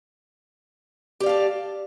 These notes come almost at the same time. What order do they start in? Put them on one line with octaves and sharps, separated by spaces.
G4 D5 F5 A4